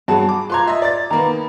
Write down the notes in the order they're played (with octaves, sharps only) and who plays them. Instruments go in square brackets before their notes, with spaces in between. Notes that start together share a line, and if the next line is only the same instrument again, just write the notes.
[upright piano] G2 F#3 F#5 [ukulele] G#4 A5
[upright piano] D6
[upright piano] F4 C6 G#6 [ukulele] B4 A#5
[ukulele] F4 [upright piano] D#5 E5
[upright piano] D5 A6
[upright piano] D#3 A#3 B3 [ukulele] A#5 B5